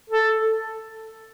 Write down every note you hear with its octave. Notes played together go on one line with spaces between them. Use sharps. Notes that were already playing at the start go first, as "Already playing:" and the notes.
A4